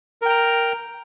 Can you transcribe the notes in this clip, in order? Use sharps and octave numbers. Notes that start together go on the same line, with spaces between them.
A#4 G5 A#5